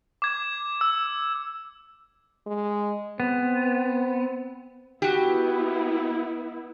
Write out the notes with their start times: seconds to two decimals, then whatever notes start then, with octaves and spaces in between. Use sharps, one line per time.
0.22 D6 G#6
0.81 E6
2.46 G#3
3.20 B3 C4
5.02 B3 E4 F#4 G4